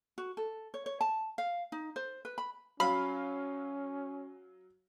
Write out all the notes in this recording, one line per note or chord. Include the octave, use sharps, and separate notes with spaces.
F#4
A4
C#5
C#5
A5
F5
D#4
C5
B4
B5
F#3 C#4 F5 B5